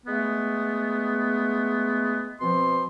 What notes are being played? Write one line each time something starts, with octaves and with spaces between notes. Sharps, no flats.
G#3 A3 B3
B2 F3 C4 C6